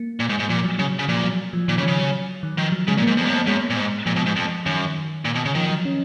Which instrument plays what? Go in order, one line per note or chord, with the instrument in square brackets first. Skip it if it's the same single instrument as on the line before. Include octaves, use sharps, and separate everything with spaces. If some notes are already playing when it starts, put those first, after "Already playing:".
Already playing: [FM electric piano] A#3
[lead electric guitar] A#2
G#2
G#2
[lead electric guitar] A#2 [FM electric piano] F3
[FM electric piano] F#3
[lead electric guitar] C#3 [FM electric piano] F#3
[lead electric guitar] C#3
[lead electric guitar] A#2 [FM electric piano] F3
[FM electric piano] F#3
F3
[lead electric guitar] A#2 [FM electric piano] D#3
[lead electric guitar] C#3
[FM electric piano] F3
[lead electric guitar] C#3
[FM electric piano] F#3
D#3
[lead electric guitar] D#3 [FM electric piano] F3
[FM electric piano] F#3
[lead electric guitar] C#3 [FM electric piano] G#3
[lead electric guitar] A#2
[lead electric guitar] G#2 [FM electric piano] A#3
[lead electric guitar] F2 [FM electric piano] B3
[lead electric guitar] F#2
[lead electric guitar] F2 [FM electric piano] A#3
[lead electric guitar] F#2 [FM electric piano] G#3
[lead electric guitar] A#2
G#2
[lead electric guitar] A#2 [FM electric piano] F3
[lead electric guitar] B2
G#2
F2
[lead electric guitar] F#2 [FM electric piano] D#3
[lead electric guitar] A#2
B2
C#3
[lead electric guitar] D#3 [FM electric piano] F3
[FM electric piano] F#3
C#4